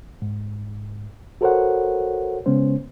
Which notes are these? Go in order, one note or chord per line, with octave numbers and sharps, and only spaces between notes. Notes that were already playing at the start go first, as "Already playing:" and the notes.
G#2
F#4 A4 A#4 C5 C#5 F#5
C#3 G#3 B3 C#4 C5